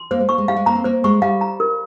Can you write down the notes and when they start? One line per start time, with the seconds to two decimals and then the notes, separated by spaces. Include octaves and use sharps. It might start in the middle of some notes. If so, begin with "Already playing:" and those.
Already playing: C6
0.11 A#3 C5
0.20 G#3
0.29 A#3 C#6
0.38 G#3
0.48 G3 F5
0.56 G#3
0.66 A#3 A#5
0.75 C4
0.84 A#3 C5
1.04 G#3 C#6
1.22 G3 F5
1.41 A#5
1.60 A#4